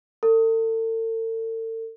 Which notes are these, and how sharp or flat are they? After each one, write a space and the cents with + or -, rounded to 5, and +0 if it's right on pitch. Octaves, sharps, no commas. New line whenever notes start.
A4 +40